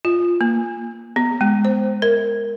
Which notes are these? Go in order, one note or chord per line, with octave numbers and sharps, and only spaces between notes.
F4
A#3
B3
G#3
C5
A#4